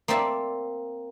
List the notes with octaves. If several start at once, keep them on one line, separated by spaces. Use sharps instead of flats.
A#3 C4 D5 E5 A5